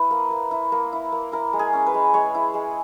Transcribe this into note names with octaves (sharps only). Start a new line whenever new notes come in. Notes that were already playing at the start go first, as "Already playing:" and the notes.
Already playing: E4 B4
A#3
A#3
E4
A#3
E4
A#3
E4 A#4
G#3
G#4
C#4
B4
G#3
G#3 C#5
E4
G#3